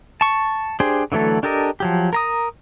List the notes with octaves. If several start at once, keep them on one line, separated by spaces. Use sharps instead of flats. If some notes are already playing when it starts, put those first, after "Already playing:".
A5 C#6
D4 G4 G#4 C5
D3 E3 F#3 A3 A4
D4 G4 A4 A#4 D#5
F3 F#3 G4
A#4 A#5 D#6